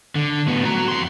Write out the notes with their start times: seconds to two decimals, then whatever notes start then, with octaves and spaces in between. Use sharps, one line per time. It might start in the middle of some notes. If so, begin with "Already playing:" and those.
0.15 D3
0.47 A2 B3
0.65 F#4 A#5
0.88 F2 C6